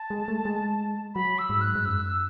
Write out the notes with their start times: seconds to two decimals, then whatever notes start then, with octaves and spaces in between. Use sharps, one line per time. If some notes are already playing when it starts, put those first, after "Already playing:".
Already playing: A5
0.10 G#3
0.28 A3
0.45 G#3
1.15 F#3 B5
1.38 E6
1.50 G#2
1.61 F#6
1.75 G#2
1.85 F#2 E6